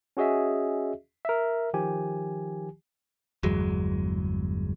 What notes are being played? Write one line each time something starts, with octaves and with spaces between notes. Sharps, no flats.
C#4 F#4 G#4 D#5 E5
A#4 E5
D#3 F3 G4 G#5
G1 E2 F#3 G#3